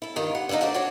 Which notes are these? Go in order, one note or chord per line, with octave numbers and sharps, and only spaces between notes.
E4 A4
G2 D#3 F4
F#5
D3 G3 A#3 D4 D#4
A3 F#4 A#4 C5 D5
D4 F#4 C#5 D5